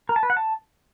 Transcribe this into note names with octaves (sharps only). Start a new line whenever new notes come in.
A#4
A5
B4
F#5
A5